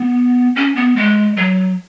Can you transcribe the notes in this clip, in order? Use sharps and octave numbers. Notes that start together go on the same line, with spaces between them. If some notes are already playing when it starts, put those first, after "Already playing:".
Already playing: B3
C#4
B3
G#3
F#3